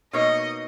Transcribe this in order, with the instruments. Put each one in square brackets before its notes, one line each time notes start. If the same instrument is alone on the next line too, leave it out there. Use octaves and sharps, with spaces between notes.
[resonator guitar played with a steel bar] B2 A#3 D#4 A#4 C#5 [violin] D#5